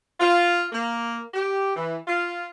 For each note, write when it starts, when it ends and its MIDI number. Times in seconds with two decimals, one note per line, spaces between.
0.20 0.66 65
0.72 1.20 58
1.34 1.73 67
1.76 1.96 52
2.08 2.47 65